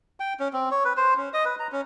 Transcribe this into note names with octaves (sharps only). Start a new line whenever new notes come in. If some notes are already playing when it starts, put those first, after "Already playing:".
G5
C#4
C4
C#5
B4
C5
C#4
D#5
B4
A#5
C#4